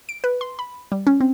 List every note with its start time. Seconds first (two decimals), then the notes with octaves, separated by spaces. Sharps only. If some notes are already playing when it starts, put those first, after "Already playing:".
0.09 D7
0.24 B4
0.41 C6
0.59 B5
0.92 G3
1.07 C#4
1.20 C4